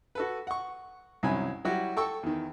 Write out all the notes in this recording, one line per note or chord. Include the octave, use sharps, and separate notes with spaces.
F#4 A4 B4
F#5 C#6
C2 F#2 D#3 C#4 G#5 B5
F#3 G3 E4 F#4 G4
A4 G5 C#6 E6
E2 D#3